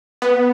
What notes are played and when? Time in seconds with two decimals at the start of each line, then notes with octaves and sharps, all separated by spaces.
0.22 B3